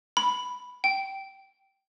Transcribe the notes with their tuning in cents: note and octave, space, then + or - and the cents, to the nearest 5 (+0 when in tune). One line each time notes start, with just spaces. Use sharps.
B5 +0
G5 -15